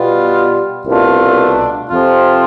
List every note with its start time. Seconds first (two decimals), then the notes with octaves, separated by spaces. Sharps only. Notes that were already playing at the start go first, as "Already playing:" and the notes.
Already playing: B2 G3 B3 F4
0.86 C2 B2 A3 D4 F4
1.90 F2 C3 F3 C4 F4